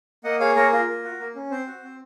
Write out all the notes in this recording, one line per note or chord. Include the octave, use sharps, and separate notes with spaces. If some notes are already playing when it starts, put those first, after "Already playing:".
A#3 D#5 F#5
G#4 C#5 F5
A#3 A#4 C#5
F4 A#4
A#3
F#4
A#3
C#4
C4 C5
F#4
C4